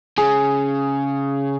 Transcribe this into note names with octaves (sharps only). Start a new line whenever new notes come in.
C#3 G#4